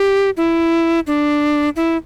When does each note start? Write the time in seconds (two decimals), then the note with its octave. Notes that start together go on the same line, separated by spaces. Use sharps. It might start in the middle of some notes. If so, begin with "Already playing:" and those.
Already playing: G4
0.37 E4
1.07 D4
1.76 E4